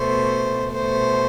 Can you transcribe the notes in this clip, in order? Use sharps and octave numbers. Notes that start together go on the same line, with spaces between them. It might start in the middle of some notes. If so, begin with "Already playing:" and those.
Already playing: B2 A3 C5
B2 A3 C5